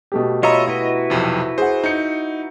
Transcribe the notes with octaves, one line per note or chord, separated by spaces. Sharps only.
B2 A3 G4
F4 C#5 D#5 E5 A#5 B5
E4 F#4 B4
B1 F2 C3
G#4 C5 F#5
D#4 G6 C#7